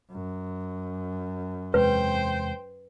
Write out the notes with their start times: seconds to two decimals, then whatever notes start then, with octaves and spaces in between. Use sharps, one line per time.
0.11 F#2
1.74 E2 C3 G#3 B4 C5 G5